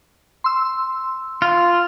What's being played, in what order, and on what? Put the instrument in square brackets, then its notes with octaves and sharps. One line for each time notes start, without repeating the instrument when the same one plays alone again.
[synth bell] C6 E6
[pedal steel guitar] F4